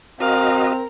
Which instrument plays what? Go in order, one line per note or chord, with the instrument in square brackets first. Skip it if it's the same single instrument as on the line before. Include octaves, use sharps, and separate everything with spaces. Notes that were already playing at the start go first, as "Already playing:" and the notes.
[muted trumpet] C4 [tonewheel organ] F#4 D#5 [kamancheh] A#4 A#5 [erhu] F5